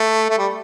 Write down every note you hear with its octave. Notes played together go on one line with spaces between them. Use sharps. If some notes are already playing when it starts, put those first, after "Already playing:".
Already playing: A3
A3
G3